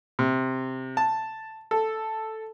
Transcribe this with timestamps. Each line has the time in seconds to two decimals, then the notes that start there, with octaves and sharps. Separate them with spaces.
0.19 C3
0.97 A5
1.71 A4